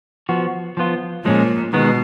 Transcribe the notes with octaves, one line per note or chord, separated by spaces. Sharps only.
F3 B3 F#4
F3 B3 F4
A#2 F3 G#3 C#4
B2 D#3 G#3 B3